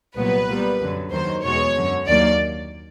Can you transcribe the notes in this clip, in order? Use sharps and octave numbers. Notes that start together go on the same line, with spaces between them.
C2 A#2 F#3 B3 B4
A#2 G3 B3
F#2 D3 F#3
D#2 D#3 F#3 C5
E2 B2 G#3 B3 C#5
F#2 D3 F#3
D#2 D#3 F#3 A#3 D5